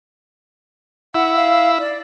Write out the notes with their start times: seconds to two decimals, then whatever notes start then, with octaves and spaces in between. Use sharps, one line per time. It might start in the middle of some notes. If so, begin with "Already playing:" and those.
1.14 E4 F#5
1.35 F5
1.79 D5